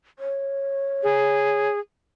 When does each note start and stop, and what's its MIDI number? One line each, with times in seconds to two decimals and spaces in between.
0.19 1.69 73
1.03 1.79 68